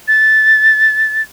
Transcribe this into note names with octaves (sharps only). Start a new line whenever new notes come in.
A6